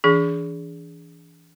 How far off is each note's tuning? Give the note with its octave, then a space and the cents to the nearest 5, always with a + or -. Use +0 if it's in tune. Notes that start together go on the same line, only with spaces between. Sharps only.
E3 +0 D4 -25 G#4 +0